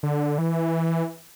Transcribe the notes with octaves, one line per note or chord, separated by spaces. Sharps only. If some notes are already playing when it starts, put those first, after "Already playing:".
D3
E3